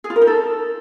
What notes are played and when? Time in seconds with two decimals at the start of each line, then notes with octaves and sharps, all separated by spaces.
0.04 G#4
0.10 F4
0.16 A#4
0.22 D#4
0.27 A4